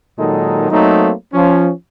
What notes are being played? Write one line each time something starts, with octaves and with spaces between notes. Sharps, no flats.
A#2 D#3 F#3 G#3 D#4 A4
F#3 A3 A#3 C4 D#4
F3 C#4